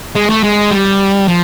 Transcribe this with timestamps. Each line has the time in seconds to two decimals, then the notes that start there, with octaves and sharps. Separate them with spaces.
0.15 G#3
0.29 A3
0.43 G#3
0.71 G3
1.28 F3